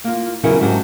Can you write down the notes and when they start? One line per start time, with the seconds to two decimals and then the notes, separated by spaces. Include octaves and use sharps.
0.04 A#3 F4
0.43 E2 C#3 F#3 E4 A#4 F#5
0.60 G#2 F#3 C#4 D4 F#4 G4